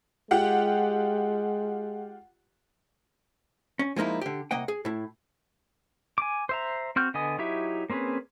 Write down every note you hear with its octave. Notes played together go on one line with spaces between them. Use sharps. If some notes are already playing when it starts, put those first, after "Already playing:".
G#3 F4 G4 F#5
C#4
F3 G#3 A#3 D#4 E4
D3 G4
C2 A#3 D#5 F#5 G5
G#4
A2 E4
G#5 D6
C5 E5 A#5
C4 F#4 F6 G6
D3 B3 D#5 G#5 D#6
F#3 D#4 E4 G4 E5
A#3 C4 C#4 G#4 B4